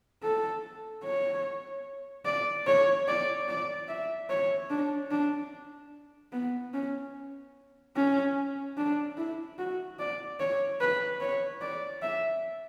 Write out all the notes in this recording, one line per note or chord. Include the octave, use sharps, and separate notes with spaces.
A4
C#5
D5
C#5
D5
D5
E5
C#5
D4
D4
B3
C#4
C#4
D4
E4
F#4
D5
C#5
B4
C#5
D5
E5